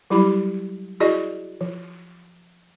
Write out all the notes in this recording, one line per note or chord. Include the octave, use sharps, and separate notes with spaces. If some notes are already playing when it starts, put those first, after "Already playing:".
F#3 G3 E4 G4 B5
E4 F#4 G#4 D5 D#5
F3